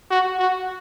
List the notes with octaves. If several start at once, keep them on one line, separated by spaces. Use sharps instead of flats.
F#4
F#4